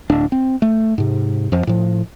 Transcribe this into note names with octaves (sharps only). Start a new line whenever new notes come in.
D1 D4
C4
A3
G#2 C3
F2 F3
A2 F3